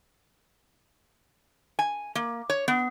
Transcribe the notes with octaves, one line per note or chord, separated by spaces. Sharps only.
G#5
A#3
C#5
B3